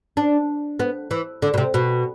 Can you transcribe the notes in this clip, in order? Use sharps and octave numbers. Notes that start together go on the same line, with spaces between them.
D4
B3
E3
D3
B2
C3
B2